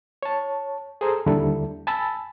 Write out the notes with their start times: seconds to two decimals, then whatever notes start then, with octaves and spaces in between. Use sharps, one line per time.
0.23 C#5 A5
1.01 G#4 A4 C5 G#5 A#5
1.26 D#2 D3 G3 E4 A4
1.87 G#5 A5 B5 E6 A6